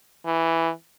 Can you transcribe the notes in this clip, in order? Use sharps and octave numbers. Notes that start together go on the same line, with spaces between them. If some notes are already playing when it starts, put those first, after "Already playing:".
E3